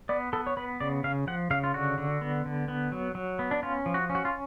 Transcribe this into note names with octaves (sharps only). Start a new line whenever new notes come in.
B3 D5
B3 A4
C#5
B3 B4
C#3 D5
C#3 F5
F3 F#5
C#3 F5
F4
D3 F#4
D3
B3
D3
B3
F#3
F#3
B3
D4
C#4 F4
F3
F#4
C#4
F#4
F4